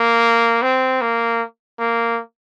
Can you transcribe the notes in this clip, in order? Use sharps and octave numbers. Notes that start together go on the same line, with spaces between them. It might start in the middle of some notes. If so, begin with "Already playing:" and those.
Already playing: A#3
C4
A#3
A#3